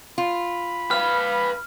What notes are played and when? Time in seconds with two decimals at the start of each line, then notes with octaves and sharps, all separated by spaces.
0.18 F4 B5
0.91 B4 F5 F6